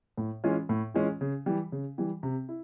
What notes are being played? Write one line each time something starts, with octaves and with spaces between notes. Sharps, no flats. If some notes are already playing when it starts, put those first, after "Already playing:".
A2
E3 G#3 C#4 F4
A2
E3 G#3 C#4 F4
C#3
E3 G3
C#3
E3 G3
C3
E4